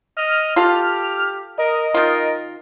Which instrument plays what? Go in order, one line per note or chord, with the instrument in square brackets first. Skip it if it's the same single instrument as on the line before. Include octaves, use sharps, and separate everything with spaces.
[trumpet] D#5 [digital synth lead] F6
[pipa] F4 A4 [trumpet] G4
[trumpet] A#4 [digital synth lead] D#5
[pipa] D#3 F4 [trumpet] A#4